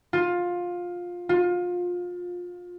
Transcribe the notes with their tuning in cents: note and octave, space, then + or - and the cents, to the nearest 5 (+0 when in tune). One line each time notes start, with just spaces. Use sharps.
F4 +15
F4 +25